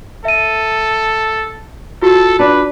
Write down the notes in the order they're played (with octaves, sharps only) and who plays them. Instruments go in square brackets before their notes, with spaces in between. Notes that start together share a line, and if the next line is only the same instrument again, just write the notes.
[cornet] A4 [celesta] E5 D#7
[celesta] F4 F#4 [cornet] A4
[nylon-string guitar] D4 [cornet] B4